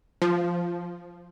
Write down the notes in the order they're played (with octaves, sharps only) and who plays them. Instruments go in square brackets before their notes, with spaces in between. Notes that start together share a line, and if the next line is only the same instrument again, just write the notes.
[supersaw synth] F3